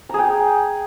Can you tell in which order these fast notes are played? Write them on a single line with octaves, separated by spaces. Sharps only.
A#5 G#4 G5